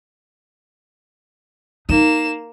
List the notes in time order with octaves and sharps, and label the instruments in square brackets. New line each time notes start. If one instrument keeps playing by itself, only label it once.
[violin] A#3 E7 [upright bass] D#4